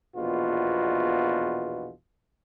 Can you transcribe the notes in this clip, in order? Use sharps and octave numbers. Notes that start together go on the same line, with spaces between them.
A#1 E2 B2 F4